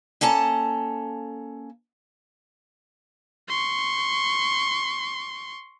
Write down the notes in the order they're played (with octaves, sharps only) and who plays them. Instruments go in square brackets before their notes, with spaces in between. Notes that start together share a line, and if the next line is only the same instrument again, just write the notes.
[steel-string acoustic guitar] A#3 C#4 A4 A5 A#5
[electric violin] C6 C#6